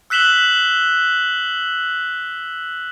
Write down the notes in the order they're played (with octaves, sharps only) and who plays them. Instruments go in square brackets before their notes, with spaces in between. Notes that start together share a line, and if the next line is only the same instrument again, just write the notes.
[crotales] E6 F#6 B6 E7 F#7 G7